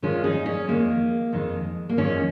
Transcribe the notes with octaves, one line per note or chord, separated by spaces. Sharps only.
F2 D#3 G#3 C#4 F4
D#4 G#4
C#4
F2 D#3 G#3 A#3
F2 D#3 G#3
A#3
F2 D#3 G#3 C#4